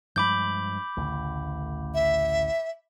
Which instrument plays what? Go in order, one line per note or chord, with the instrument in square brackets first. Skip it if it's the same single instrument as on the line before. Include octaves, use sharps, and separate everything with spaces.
[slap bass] G2 F3 G#3 [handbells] B5 D6 G6
[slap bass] A1 D2 C#3
[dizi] E5